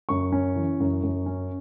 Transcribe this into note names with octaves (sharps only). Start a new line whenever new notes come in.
F#2 C#6
C#4
E3
F#2
F#2
C#4